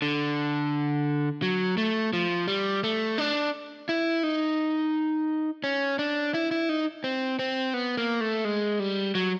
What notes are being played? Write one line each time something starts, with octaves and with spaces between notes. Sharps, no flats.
D3
F#3
A3
F3
G3
A3
D4
E4
D#4
C#4
D4
E4
E4
D#4
C4
C4
B3
A#3
A3
G#3
G3
F#3